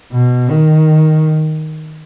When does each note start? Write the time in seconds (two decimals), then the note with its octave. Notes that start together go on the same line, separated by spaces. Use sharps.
0.12 B2
0.49 D#3